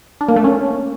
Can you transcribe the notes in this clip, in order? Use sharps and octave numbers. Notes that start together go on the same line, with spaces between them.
D4
A#3
A3
C#4